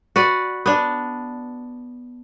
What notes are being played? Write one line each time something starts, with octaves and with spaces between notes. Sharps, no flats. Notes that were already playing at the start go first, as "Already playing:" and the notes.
F#4 B4 D5
B3 D4